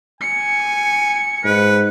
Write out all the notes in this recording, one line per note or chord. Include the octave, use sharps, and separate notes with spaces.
G#5 C#7
G#2 B4